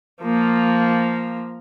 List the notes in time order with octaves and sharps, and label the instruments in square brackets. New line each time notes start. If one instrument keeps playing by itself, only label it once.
[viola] F3 A#3